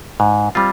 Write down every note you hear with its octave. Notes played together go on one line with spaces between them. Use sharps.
G#2
G3 C4 F4